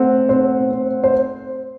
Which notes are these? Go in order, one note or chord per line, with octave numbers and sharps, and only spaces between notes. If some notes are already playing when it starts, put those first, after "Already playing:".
Already playing: A3 C4 F#5
C4 C5
C4
C5